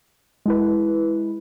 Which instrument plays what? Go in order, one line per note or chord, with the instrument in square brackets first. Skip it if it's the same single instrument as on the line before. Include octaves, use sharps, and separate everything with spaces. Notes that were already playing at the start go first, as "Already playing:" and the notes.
[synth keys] G#3 E4 B4